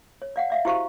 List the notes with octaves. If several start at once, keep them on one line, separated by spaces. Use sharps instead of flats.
C#5
D5 F5 F#5
D5 E5 F5
E4 F#4 G4 C5 F5 C#6